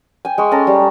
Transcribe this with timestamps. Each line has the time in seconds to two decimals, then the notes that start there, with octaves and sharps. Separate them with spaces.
0.25 G5 G#5
0.38 G#3 C#6
0.51 C#4 A4 A#5
0.67 G3